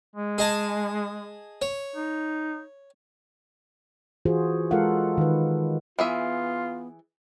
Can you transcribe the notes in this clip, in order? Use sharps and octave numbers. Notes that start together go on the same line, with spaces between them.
G#3
G#4 D#5 A5
C#5
D#4
E3 F4 F#4 G#4 C5
G#3 F4 A4 A#4 F5 F#5
D#3 B4
E3 B3 F4 G#4 E5